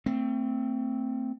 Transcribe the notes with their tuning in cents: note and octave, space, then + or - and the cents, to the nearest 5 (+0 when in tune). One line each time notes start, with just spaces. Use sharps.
A3 +35 C4 +0